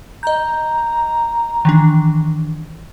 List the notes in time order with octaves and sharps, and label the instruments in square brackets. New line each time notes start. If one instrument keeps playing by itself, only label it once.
[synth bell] D#5 G6 [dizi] A#5
[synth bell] D#3 E3 D4